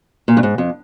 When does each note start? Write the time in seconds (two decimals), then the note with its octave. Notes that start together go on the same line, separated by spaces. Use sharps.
0.28 A#2
0.37 G2
0.43 G#2
0.58 F2